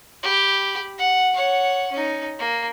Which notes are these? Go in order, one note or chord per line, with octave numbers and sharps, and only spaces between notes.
G4 B5
F#5
C#5 F#5
C#4 D#4
A#3